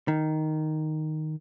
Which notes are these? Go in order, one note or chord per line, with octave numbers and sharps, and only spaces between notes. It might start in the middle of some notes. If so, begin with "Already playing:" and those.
D#3